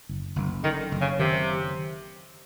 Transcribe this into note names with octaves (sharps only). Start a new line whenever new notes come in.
F#1
F#1
D3 D#3
F#1
C#3
C3 D#3